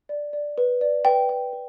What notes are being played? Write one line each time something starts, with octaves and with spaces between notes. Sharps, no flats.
D5
D5
B4
D5
B4 G5
G5
B4